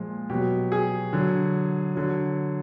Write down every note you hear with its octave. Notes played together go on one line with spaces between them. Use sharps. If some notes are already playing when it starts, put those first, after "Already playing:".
Already playing: A#2 F3 G#3 F4
B2 F#3 G4
G#4
D3 F#3
D3 F#3